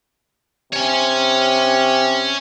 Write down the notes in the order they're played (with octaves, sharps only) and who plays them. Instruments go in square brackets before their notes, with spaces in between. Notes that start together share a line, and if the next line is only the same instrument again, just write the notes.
[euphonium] C3 [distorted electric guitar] C#5 G#5